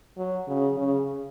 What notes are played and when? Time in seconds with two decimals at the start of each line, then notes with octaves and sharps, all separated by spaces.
0.17 F#3
0.48 C#3
0.77 C#3